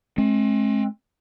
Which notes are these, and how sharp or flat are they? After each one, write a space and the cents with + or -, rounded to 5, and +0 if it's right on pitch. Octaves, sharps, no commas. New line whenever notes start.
G#3 +45 C4 +45